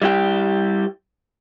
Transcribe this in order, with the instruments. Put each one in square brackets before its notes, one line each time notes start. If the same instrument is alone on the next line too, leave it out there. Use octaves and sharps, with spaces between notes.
[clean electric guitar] G3 E4 G4